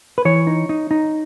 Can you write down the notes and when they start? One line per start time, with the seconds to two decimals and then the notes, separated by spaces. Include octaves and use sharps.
0.18 B4
0.25 E3 C#5
0.47 D#4
0.69 D#4
0.91 D#4